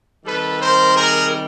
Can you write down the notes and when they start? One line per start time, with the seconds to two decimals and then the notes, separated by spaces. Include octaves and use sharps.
0.24 C3 D#3 G3 A4 B4
0.59 A#4 C5
0.94 G#4 A#4